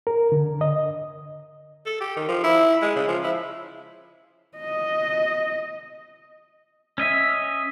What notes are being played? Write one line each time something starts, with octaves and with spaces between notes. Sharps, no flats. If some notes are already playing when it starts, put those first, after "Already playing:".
A#4
D3
D#5
A4
G4
D#3
F3
E4
G#3
C#3
F3
E4
D#5
C#4 D#5 E5